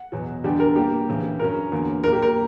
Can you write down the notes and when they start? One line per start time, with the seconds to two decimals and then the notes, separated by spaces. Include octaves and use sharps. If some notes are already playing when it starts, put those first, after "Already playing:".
Already playing: F#5
0.12 E2 B2 F#3
0.44 E2 D3 G3 B3 D4 G4
0.60 A#4
0.76 A#2 G3 A#3 G4
1.09 D2 C#3 E3
1.39 G2 F#3 C#4 A#4
1.72 E2 D3 F#3 A#3
2.04 A#2 F#3 A#3 A#4
2.13 G4
2.22 A#4